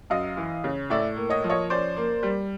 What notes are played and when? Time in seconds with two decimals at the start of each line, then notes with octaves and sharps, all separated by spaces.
0.10 F#2 D#5 F5
0.37 E3
0.64 C#3
0.90 A2 D5 E5
1.16 A#3
1.30 C#5 D#5
1.44 F3
1.50 C#5 D#5
1.70 C#4 C5 D5
1.97 A#3
2.23 G3